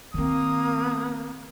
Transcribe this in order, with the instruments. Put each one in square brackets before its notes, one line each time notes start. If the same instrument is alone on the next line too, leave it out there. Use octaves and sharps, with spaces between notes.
[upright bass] D#3 C4 [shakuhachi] A#3 [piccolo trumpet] D#6